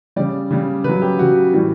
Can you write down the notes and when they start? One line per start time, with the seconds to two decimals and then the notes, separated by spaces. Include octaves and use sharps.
0.16 C#3 G3 D5
0.51 C#3 G3
0.84 C#3 F#3 B4
1.02 G4
1.18 C#3 F#3 F#4
1.53 A2 E3 G3